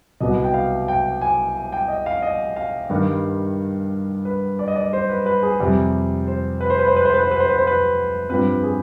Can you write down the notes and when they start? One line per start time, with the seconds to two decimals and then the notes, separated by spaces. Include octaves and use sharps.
0.20 C2 B2 B3 D#5
0.44 G5
0.54 F5
0.88 G5
1.21 G#5
1.72 G5
1.88 D#5
2.06 F5
2.22 D#5
2.56 F5
2.90 G2 D#3 G3
4.25 B4
4.59 D5
4.68 D#5
4.76 D5
4.93 C5
5.09 B4
5.26 B4
5.43 G#4
5.60 F2 C3 G3
6.27 C5
6.61 B4
6.70 C5
6.79 B4
6.88 C5
6.96 B4
7.05 C5
7.14 B4
7.23 C5
7.31 B4
7.40 C5
7.49 B4
7.58 C5
7.67 B4
8.30 G2 F3 C4 B4
8.63 G#4